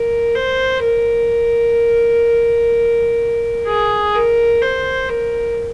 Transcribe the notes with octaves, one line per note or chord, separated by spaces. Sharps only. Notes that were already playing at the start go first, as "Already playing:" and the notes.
Already playing: A#4
C5
A#4
G#4
A#4
C5
A#4